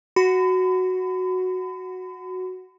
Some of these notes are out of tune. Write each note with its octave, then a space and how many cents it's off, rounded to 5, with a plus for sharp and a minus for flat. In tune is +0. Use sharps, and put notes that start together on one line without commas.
F#4 +0 B5 +40